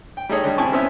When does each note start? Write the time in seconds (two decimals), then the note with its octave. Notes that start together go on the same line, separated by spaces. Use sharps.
0.17 G5
0.29 G3 A3 D#4 G#4 C#5
0.44 D3 G3
0.58 C3 C4 E4 G#5 A5 C#6
0.72 B3 C#4 C5 E5